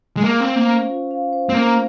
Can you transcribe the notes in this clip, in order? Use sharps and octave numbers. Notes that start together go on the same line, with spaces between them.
G#3
A#3 F5
C4 C5
A#3
C#4
F4
F5
C5
C4
A#3 C#4